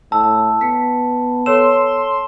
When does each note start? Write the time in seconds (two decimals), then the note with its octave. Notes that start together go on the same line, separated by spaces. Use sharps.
0.12 A2 A5 E6
0.61 B3 B6 C#7
1.46 A4 C#5 C6 E6 E7